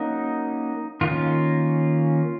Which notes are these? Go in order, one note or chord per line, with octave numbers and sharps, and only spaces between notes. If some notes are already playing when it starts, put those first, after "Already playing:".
Already playing: F#3 A#3 C#4 D#4
D#3 A#3 C#4 F4